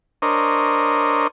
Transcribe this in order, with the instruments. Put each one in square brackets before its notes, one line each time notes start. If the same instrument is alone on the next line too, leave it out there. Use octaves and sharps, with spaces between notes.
[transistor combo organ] D4 A#4 C5 C#5 D#5